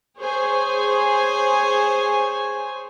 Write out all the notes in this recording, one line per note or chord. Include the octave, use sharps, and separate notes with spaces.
G#4 C5 C#5 G#5